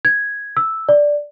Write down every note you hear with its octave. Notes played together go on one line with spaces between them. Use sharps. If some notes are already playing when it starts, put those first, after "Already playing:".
G#6
E6
D5